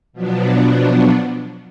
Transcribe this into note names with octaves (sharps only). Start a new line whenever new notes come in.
B2 F3 F#3 B3 D4